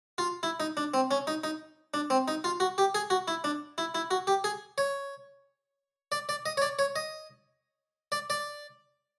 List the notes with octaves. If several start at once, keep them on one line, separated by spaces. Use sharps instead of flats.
F4
E4
D#4
D4
C4
C#4
D#4
D#4
D4
C4
D#4
F4
F#4
G4
G#4
F#4
E4
D4
E4
E4
F#4
G4
G#4
C#5
D5
D5
D#5
C#5
D5
C#5
D#5
D5
D5